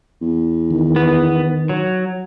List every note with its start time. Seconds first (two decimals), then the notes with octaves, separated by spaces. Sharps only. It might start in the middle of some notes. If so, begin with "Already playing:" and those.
0.21 E2
0.70 D#3
0.96 B3
1.69 F#3